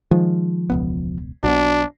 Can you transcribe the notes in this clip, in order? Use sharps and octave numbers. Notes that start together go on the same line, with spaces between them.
D#3 F3 G#3
E1 C#2 B3
B1 B2 D4 F#4